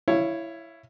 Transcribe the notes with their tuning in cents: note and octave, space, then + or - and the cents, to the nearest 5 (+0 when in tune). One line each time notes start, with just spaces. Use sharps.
E4 +10 C#5 +0 F5 -15